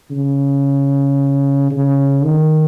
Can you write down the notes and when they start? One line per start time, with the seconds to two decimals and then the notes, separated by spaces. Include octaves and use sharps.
0.10 C#3
1.71 C#3
2.24 D#3